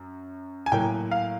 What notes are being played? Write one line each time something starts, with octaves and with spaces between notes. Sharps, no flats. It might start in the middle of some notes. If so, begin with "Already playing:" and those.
Already playing: F#2
G#5
A2 F#3 A#3 G5
F5